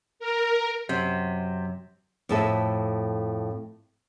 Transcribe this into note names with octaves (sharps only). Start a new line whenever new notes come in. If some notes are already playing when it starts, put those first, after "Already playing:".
A#4
F#2 C3
F2 A2 A4 E5